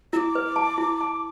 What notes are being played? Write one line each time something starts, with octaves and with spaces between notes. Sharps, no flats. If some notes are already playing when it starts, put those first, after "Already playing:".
E4 D6 E6
B4
A5
E4
A5